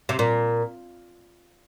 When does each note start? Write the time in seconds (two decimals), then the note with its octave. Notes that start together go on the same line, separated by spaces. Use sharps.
0.09 C3
0.19 A#2